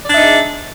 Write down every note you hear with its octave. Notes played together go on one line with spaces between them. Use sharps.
D4 D#4 G#4 D5 E5